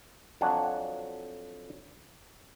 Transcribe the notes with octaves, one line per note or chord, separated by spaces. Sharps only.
F2 F#3 D4 F#5 G#5